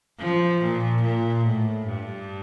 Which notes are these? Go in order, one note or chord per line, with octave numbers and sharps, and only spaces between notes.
F3
A#2
A#2
A2
G2